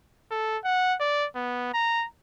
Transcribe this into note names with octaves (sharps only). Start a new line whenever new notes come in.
A4
F#5
D5
B3
A#5